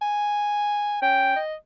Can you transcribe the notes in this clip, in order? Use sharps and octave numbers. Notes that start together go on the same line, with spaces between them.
G#5
C#4 G5
D#5